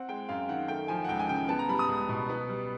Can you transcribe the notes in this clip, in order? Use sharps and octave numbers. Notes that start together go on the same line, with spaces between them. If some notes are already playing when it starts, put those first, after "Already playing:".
Already playing: C4 F#5
G#3 G5
F#2 F5
D#3 F#5
A3 G5
F3 G#5
F#5
C#2 G5
G#5
C#3 G5
B3 A5
A#5
G3 B5
D#6
C#2
B2
B3
G3